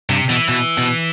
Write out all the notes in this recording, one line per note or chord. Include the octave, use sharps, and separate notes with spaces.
G2 C3
B2 E3
B2
B2